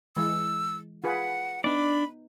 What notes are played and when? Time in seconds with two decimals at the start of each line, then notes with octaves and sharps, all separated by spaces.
0.17 E3 G#3 E6
1.04 F4 G#4 B4 F#5
1.64 B3 D4 D#4 D5 B5